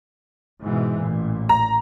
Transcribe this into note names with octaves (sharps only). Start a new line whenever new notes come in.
G#2 B2 E3
A1 A#2
A#5